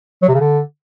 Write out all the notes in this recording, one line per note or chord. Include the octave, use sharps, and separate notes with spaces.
F#3
C3
C#3
D3